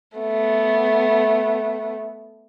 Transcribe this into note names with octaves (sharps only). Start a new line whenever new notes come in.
A3 B3